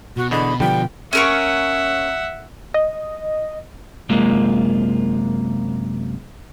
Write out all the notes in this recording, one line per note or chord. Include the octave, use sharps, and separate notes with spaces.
B2 F#4
E2 D3 D#5 B5
D3 F3 G3 B3 G5
C#4 A#4 E5 F#5 C#6
D#5
F#2 C3 G#3 A#3 F4